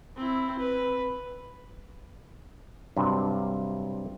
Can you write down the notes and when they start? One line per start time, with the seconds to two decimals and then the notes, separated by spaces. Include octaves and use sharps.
0.17 C4 E4
0.58 B4
2.97 G2 C3 F#3 D4